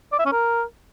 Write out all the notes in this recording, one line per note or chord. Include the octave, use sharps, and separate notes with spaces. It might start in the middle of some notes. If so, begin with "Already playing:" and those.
D5
E5
C#4
A#4